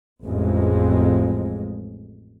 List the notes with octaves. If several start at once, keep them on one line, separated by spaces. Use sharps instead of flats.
A1 F2 G#3